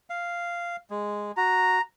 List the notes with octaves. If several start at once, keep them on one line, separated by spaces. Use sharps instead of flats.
F5
G#3
F#4 A#5